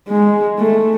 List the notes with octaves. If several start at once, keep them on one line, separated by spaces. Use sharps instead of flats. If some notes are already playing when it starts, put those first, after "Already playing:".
G#3
A3